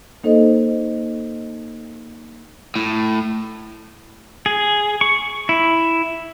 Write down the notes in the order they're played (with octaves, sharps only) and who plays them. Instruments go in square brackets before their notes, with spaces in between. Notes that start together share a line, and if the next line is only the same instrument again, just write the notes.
[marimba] A#3 D#4 A4 C5 D#5
[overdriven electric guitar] A2
[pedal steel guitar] G#4
C#6
E4